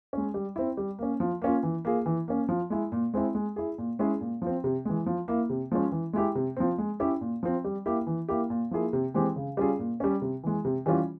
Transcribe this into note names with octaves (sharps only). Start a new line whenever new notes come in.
G#3 C#4
G3
C4 E4
G3
A#3 C#4
F3
A#3 C#4 F4
E3
A#3 F4 G#4
E3
A#3 C#4
F3
G#3 E4
A#2
G#3 C4 E4
G#3
E4 G#4
A#2
G#3 C#4 E4 G#4
A#2
F3 C4
C3
E3 G#3
F3
A#3 E4
C3
F3 G#3 C#4
E3
G#3 E4 G4
C3
F3 C4
G#3
C#4 E4 G4
A#2
F3 C4
G3
A#3 E4 G4
E3
A#3 E4 G4
A#2
F3 A#3 E4 G#4
C3
E3 G#3 C4 G4
C#3
G3 C#4 F4 G#4
A#2
G3 C#4
C3
E3 G#3
C3
E3 G3 C#4 F4